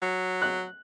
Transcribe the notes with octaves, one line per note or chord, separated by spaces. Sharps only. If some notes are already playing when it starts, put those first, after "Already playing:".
F#3
F#6